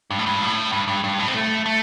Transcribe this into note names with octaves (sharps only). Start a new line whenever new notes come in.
G2
A2
G2
A2
G2
G2
G2
A2
C4
A3
A3